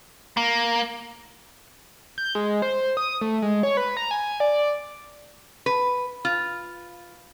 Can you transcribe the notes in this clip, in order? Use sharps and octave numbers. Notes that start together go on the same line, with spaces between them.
A#3
G6
G#3
C5
D#6
A3
G#3
C#5
B4
A#5
G#5
D5
B4
F4